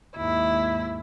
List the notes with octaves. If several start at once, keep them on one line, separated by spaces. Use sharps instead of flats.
D#2 G#2 E4